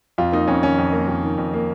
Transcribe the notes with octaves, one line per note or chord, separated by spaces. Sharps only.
F2 F4
A#3 D#4
F2 C#4
D#3 C#4
F2
A#3
F2
D#3
F2
A#3